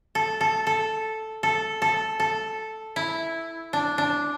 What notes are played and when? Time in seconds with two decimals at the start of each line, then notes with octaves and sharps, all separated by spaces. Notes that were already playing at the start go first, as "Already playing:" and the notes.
0.15 A4
0.41 A4
0.67 A4
1.43 A4
1.82 A4
2.20 A4
2.96 E4
3.73 D4
3.98 D4